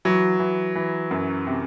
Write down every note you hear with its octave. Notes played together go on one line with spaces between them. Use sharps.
E3 F#3
E3
E3
F#2
C3